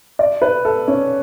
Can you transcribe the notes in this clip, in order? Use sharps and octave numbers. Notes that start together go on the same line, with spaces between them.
D5
B4
A4
C#4